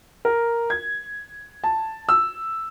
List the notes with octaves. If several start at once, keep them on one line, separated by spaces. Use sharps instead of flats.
A#4
G#6
A5
E6